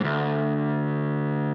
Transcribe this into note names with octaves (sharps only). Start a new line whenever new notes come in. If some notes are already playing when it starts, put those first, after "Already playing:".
D2 G#2